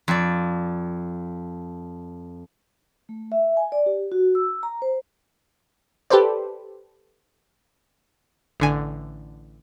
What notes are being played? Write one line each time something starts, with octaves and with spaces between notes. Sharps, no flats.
F2 D5
A3
E5
G#5
D5
G4
F#4
E6
A#5
C5
G4 A4 B4 C5 D5
A1 D3 G#5